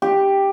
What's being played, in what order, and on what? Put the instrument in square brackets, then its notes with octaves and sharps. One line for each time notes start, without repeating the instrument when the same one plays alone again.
[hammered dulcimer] G4